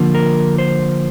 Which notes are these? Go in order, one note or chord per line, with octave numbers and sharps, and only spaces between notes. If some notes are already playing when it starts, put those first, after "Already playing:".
Already playing: D3 F3 A#3
A#4
C5